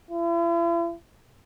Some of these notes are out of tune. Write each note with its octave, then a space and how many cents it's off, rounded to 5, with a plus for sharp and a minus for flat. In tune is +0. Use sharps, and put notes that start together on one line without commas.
E4 +45